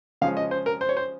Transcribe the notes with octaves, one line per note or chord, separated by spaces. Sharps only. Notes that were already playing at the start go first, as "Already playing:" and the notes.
C#3 F3 G#3 C#4 F5
D#5
C5
A#4
C5
C#5
C5